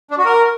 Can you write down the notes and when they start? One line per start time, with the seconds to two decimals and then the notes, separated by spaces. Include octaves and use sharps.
0.11 D4
0.18 F#4
0.25 A#4